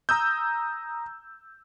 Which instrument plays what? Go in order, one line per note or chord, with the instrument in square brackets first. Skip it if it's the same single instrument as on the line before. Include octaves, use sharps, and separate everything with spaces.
[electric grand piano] A#5 D#6 E6 G6